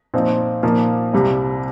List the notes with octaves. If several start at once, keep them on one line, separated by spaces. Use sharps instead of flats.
A#2 F3 C4 D#4
A#2 F3 A#3 D#4
C2 C3 G3